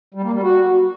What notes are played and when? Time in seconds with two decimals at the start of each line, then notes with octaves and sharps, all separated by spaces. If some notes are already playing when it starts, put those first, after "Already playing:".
0.14 G3
0.24 A#3
0.33 G3
0.43 F#4